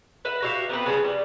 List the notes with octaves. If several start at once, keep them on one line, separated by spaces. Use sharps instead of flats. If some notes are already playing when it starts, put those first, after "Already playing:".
B4 E5 F#5
F#4 G4 E5 F5
B3 C4 G4 B4
C#3 F3 G3 C4
G3